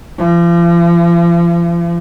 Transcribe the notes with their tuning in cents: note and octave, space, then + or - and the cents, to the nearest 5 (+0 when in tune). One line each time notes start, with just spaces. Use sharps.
F3 -40